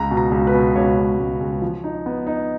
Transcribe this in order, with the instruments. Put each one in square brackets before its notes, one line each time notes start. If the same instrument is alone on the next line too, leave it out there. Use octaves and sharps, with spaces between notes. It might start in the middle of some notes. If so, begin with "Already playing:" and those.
Already playing: [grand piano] C#2 A#5
B2
A#5
C#2
B4
B2
C#2 C#5
C#2
C#2
C#2
F3
D#4
B3
D#4